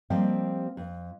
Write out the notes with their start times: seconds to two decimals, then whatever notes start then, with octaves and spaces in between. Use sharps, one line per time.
0.10 F3 G3 A#3 C4 G4 D#5
0.77 F2